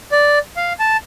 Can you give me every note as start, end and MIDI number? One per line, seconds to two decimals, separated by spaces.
0.12 0.39 74
0.57 0.73 77
0.80 0.97 81